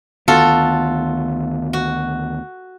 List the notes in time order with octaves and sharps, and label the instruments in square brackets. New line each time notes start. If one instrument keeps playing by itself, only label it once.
[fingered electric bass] D2 D#3 B3 [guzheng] F4 F#4 A4
[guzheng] F#4